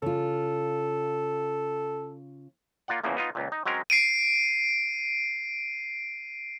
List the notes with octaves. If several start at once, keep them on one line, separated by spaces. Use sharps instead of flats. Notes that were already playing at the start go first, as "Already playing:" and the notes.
C#3 F4 A4
A#3 F4 D5 F#5
E2 C#3 E3 F3 A#3
B3 D#4 F4
C#2 A#2
D#4
F#3 G#3 C4 C#4 A#4
C7 D7 D#7